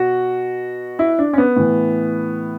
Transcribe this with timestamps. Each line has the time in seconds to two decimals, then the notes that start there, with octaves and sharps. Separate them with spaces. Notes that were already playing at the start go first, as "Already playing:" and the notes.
Already playing: B2 F#4
0.99 E4
1.19 D4
1.33 C#4
1.38 B3
1.56 A2 E3